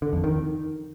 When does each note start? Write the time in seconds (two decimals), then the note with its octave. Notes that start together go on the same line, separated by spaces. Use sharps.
0.02 D3
0.13 F2
0.24 D#3